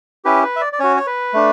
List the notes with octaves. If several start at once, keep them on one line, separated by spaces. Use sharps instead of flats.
C#4 E4 G4 B4
B4
E5
D5
D5
C#4 F#4 C#5
C#5
B4
A3 D4